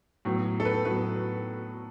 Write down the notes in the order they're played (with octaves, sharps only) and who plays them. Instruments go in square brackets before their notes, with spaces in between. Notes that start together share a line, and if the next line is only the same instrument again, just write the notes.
[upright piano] A2 F#3 B3
A4
B4
A2 F#3 B3 B4